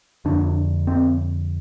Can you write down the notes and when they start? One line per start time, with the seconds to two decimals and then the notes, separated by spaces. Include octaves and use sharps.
0.25 F2 D3 D4
0.87 C4